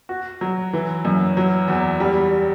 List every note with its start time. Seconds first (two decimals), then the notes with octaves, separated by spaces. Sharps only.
0.09 F#4
0.41 F#3
0.73 E3
1.05 F#2
1.37 F#3
1.68 E2
2.00 G3